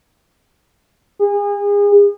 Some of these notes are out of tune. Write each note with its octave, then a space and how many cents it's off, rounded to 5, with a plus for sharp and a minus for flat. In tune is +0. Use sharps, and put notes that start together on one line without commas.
G#4 -35